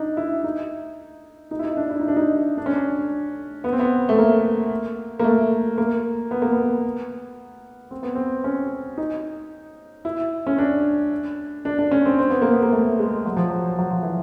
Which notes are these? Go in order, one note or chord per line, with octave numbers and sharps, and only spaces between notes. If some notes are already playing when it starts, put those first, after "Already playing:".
Already playing: D4 D#4
E4
D#4
D#4
E4
D#4
D4
E4
D#4
D4
D#4
D4
C#4
D4
B3
C4
B3
A3
A#3
A#3
A3
A#3
B3
A#3
B3
C4
B3
C4
C#4
D#4
E4
C#4
D4
D4
D4
C#4
C4
C4
B3
A#3
B3
A#3
A3
G#3
F#3
F3
F#3
F#3
F3
E3